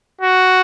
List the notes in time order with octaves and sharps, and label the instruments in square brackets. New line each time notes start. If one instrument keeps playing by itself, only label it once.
[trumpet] F#4